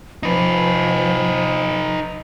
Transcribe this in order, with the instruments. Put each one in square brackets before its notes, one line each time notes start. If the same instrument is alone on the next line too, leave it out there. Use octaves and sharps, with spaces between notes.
[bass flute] F3 [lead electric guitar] D#4 B4